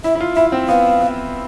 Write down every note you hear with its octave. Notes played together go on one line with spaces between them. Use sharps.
E4 E5
E4
F4
E4 E5
C4
B3 F5
B3